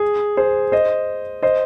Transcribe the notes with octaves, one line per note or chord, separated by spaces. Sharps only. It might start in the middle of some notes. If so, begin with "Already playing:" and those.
Already playing: G#4
G#4 C5
C5 D#5
C5 D#5